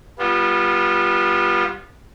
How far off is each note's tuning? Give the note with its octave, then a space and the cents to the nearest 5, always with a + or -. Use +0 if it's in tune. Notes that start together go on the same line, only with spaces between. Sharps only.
G3 +0 B3 -25 F4 +0